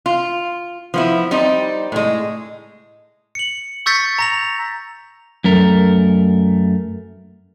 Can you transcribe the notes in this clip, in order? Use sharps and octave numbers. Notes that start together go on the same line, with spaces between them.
F4
F3 B3 E4
G3 C4 D#4
A2 G#3
C#7 F#7
C#6 E6 G6 A6 B6 C#7
A#5 A#6 F7
F#2 A3 A#4